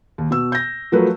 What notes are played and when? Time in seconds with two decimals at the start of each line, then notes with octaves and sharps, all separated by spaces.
0.18 D#2
0.31 B2 E6
0.52 G6 A#6
0.92 F3 F#3 A3 A#4 B4